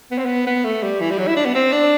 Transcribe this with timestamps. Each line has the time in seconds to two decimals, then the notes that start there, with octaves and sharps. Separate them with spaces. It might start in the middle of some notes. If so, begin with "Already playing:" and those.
0.11 B3
0.18 C4
0.25 B3
0.47 B3
0.65 A3
0.83 G3
1.01 E3
1.11 G3
1.18 F#3
1.28 E4
1.36 D4
1.45 B3
1.55 C4
1.72 D4